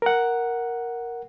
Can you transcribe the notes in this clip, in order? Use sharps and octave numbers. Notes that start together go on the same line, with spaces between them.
A#4 F#5